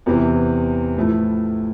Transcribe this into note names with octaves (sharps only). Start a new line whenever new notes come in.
E2 C3 E3
A2 F3 A3 E4